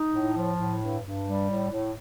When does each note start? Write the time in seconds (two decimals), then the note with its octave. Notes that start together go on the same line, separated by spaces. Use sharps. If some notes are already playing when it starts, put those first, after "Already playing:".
Already playing: D#4
0.12 A2
0.35 F3
0.58 A2
0.80 G2
1.03 G2
1.26 G3
1.48 A2
1.70 A2